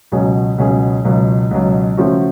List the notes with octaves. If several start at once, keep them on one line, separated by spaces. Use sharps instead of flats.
C#2 B2 F#3 C#4 G#4
C#2 B2 F#3 C#4 G#4
C#2 B2 F#3
C#2 B2 F#3
C#3 F3 A3 C#4 F#4